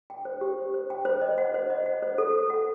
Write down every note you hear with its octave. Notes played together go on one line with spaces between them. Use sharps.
G5
C5
G4
C5
C5
G5
C5
D#5
F#5
C5
D#5
F#5
C5
A4
A4
F#5